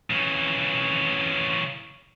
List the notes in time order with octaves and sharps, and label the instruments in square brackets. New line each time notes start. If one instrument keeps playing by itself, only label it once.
[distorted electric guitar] C#3 E3